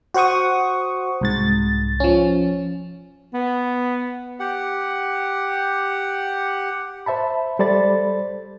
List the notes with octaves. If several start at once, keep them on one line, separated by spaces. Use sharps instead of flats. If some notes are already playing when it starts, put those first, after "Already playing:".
F#4 C5 F#5 C#6 D#6
C2 G#2 A6
F3 C#4
B3
G4 F#5
C5 E5 A5 B5
G3 A4 C5 D5 B5 A6